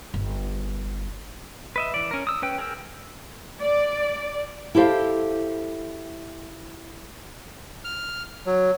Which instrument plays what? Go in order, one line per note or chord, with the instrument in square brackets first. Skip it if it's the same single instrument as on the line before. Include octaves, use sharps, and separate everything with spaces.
[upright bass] G1
[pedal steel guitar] B4 D#5 E5
E3 D5
C#4 A#4
D#6 E6
C#4 B4 G5
G#4 A#4 G5 E6
[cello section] D5
[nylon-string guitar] E4 G4 A4 C5 F5
[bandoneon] F6
F#3